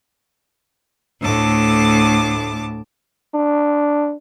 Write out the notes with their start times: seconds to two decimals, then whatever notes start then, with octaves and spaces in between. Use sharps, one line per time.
1.20 D2 A2 A5 D6
3.34 D4